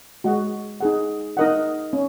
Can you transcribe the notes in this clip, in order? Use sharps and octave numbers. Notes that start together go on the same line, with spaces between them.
G#3 F#4 D#5 F#5
D#4 G#4 F#5
D#4 A#4 D#5 F#5
C#4